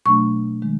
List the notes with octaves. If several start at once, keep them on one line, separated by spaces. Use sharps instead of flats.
B2 F#3 A3 D4 C#6
D#3 G#3